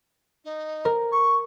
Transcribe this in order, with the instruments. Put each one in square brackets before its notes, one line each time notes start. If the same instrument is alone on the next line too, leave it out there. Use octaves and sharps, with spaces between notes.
[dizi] D#4
[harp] A#4
[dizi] C#6